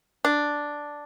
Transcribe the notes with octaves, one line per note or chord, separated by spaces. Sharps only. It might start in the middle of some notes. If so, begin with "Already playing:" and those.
D4